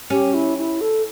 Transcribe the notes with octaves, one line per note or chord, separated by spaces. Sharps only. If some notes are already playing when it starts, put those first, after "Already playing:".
C#4 G4
E4
E4
A4